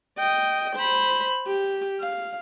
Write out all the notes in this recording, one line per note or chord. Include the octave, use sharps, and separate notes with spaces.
D#5 G5
C5 B5
G4
F5